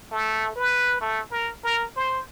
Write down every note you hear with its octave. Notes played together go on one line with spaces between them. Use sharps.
A3
B4
A3
A#4
A#4
C5